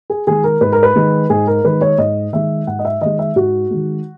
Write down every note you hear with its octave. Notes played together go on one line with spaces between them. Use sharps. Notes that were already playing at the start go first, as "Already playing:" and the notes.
G#4
D#3 G#3 G#4
A#4
G#2 B4
A#4
B4
D#3 G#3
G#2 G#4
A#4
D#3 G#3 B4
C#5
G#2 D#5
D#3 G#3 E5
G#2 F#5
D#5
E5
D#3 G#3 D#5
E5
G#2 F#4
D#3 G#3